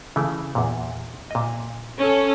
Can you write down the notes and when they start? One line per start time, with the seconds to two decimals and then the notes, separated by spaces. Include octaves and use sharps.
0.16 C#3 E3 A3
0.55 E2 A#2
1.31 A#2 D#5
1.98 C#4 A4